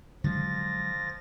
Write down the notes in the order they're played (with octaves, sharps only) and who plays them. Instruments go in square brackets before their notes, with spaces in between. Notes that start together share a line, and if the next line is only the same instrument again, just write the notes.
[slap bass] D3 F#3 G#3 [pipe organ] F3 A6 A#6